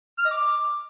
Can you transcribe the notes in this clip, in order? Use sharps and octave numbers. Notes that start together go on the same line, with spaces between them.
F6
D#5
D6